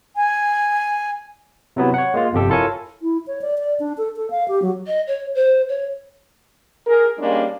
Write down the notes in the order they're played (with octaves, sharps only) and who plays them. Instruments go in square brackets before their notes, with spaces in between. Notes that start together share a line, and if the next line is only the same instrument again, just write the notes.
[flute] G#5
[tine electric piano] C3 F#3 B3 E4
C#5 F#5
G#3 A#3 F4
G1 F2 C3 G4 A4
E4 F4 A4 A#4 C#5 G#5
[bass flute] E4
C#5
D5
D5
D4
A4
A4
F5
G4
F#3
[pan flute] D#5
C#5
C5
C#5
[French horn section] G#4 A#4
G3 G#3 A#3 C#4 D4